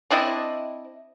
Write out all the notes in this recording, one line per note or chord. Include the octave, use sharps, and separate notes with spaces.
C4 D4 E4 D#5